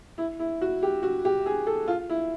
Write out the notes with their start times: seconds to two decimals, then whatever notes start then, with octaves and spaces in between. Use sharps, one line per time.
0.18 E4
0.39 E4
0.61 F#4
0.83 G4
1.03 F#4
1.25 G4
1.46 G#4
1.67 A4
1.88 F4
2.10 E4